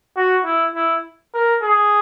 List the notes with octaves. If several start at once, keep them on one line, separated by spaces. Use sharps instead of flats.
F#4
E4
E4
A#4
G#4